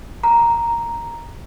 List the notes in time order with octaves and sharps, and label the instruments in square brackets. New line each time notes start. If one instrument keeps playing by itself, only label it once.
[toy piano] A#5